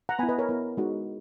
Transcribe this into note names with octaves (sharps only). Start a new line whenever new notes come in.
F#5 A#5
B3 E4 G#5 B5
B4 D#5
A#4 C#5
B3 E4
G#3 D#4 F#4